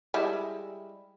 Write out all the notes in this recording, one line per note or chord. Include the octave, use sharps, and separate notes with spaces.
G3 G#3 E4